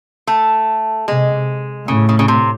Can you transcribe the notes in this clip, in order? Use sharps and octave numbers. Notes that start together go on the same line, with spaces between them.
A3
C3 G#3
A2 C#3
C#3
C#3
C3